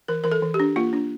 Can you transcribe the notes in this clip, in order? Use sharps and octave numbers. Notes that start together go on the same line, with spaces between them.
E3 A#4
E3 A#4
A4
E3
G4
D4
A#3 F4
D4